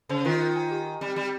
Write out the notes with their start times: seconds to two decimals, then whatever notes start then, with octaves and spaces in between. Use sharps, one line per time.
0.09 C#3 C5
0.25 D#3 F4
0.41 F4
0.56 G#5
0.71 G4
0.86 G4
1.01 G3 C4
1.16 G3 G4